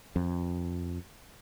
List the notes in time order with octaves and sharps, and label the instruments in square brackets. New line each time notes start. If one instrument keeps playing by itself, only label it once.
[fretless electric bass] F2